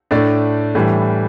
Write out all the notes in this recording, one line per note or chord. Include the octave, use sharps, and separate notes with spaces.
A2 A3 D4 D5
A2 E3 G3